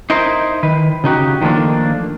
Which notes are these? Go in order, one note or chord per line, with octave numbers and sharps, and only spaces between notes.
D#4 E4 A#4 C5
D#3 B4
C#3 D#4 F#4 G4
D#3 F3 A3 A#3 D4